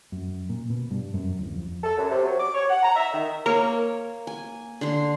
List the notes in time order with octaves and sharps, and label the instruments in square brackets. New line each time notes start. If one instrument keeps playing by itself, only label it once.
[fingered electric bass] F#2
A#2
B2
G2
F#2
D1
F2
[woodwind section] A4
F#2
C3
F#3
D6
C#5
F#5
A#5
E5
D#3
[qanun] A#3 C#5 [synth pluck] A#4
[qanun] G#5
D3 C6